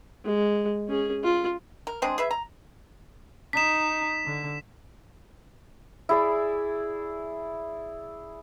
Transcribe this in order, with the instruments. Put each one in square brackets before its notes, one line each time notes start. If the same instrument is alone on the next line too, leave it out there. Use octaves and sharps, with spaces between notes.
[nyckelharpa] G#3
C#4 G#4
F4
[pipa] A#4
G#3 C4 D4 G#4
G#4 B4 E5
A#5
[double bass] D#4 [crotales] B6 E7
[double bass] D3
[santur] E4 G#4 D5